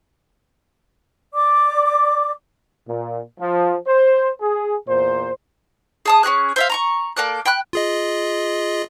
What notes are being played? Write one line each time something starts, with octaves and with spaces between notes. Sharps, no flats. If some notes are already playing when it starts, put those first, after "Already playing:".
D5 D6
A#2
F3
C5
G#4
E2 A#2 C5
G#4 A5 D#6
C#4 G4 G#4 F#6
C5 E5 F5
A#5 C6 C#6
A#3 A4 D5 F#6
G5 B5 F#6
F4 G#4 D#5